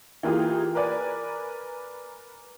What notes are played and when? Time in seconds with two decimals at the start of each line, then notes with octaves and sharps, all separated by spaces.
0.23 E3 A#3 F4 G4 G#4
0.75 A#4 B4 D5 G#5